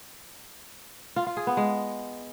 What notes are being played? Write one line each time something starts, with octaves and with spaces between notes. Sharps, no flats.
F4
F4
G#4
B3
G#3